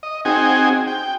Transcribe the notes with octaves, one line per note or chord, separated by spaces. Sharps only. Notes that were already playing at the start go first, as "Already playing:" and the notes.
D#5
C4 D#4 F#4 G#4 G5 G#5
G5